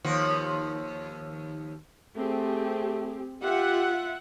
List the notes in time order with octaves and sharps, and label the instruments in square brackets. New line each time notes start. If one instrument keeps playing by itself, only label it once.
[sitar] D#2 F3 F#4
[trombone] A3 [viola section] C4 G4 G#4
[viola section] F4 E5 F#5 [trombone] G4